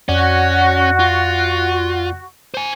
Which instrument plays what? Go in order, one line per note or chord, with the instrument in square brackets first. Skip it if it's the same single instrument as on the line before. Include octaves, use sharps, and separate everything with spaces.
[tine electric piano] F2 D5 F#5 [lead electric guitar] C#4 [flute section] F#4
[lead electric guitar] F4
C5 G#5